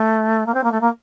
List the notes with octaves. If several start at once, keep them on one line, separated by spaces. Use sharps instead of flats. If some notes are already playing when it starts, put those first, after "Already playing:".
Already playing: A3
A#3
C4
A#3
A3
A#3